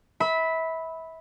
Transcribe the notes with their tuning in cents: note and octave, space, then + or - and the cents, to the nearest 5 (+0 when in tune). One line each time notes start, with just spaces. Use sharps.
E5 -30 B5 +0